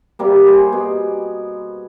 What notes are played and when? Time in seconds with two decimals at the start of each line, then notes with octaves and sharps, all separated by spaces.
0.19 C3 G3 A#3
0.46 G#4 C5
0.72 B2